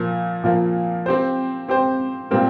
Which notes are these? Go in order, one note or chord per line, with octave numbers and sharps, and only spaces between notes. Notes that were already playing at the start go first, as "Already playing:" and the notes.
Already playing: A#2 F3 A#3
A#2 F3 A#3
C4 G4 C5
C4 G4 C5
A#2 G3 C4 G4 A#4